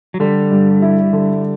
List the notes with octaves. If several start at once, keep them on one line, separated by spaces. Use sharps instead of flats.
F#3
D3 G3
G2
E4
D3